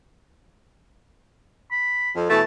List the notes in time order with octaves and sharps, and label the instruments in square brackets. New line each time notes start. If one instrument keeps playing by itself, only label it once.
[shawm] B5
[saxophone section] F2
[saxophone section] B2 E3 A3 [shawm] A5